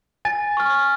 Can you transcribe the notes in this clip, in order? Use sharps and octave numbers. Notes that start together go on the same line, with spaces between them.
G#5 A6
C#6 F6